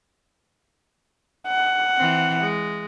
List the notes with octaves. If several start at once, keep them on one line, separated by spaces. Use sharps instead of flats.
F#5
E3 C4
G#3